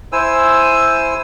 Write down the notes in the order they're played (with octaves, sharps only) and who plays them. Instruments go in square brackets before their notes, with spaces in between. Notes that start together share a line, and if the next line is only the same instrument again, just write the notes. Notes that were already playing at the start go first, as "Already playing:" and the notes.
[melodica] E4 C5 G#5 E6